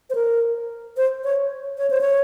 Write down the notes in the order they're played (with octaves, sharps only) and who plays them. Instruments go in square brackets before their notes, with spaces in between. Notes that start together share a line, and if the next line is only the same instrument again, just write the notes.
[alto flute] C5
A#4
C5
C#5
C#5
C5
C#5